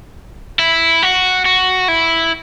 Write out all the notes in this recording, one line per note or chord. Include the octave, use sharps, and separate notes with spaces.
E4
F#4
F#4
E4